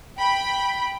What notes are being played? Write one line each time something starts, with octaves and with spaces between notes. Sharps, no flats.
G5 B5